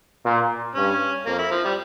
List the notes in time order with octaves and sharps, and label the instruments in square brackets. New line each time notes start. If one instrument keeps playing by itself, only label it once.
[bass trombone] A#2
[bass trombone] G2 [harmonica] C#4
[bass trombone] F2 [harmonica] A#3
[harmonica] E4
F3
G3